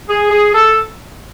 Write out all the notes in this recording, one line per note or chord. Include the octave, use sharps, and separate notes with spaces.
G#4
G#4
A4